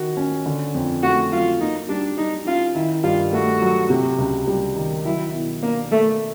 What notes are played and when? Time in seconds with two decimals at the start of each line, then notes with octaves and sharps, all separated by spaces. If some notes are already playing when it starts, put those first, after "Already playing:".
Already playing: D#3 F#4
0.17 C#4
0.46 D3
0.74 F2
1.03 A3 F#4
1.32 F#3 F4
1.60 A#3 D#4
1.89 G3 D4
2.18 G3 D#4
2.46 C#4 F4
2.75 D#3 E4
3.03 G2 F4
3.33 A3 F#4
3.62 F#3
3.90 C3
4.19 C#2
4.47 G3
4.76 D#3
5.05 F#3 E4
5.34 B2
5.62 A#3 D4
5.91 A3 A#3